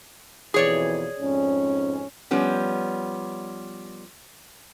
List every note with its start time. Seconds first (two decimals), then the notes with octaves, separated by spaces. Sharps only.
0.54 F2 B2 E3 G#4 C#5 D5
1.20 F2 G#2 C#4
2.31 F3 G3 B3 C#4